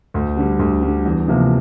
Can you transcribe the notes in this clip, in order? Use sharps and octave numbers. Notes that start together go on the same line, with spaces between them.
D2
D3 G3
D2
D3 G3
E2
C3 F3 A#3